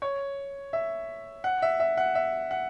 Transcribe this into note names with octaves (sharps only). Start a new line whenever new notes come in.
C#5
E5
F#5
E5
E5
F#5
E5
F#5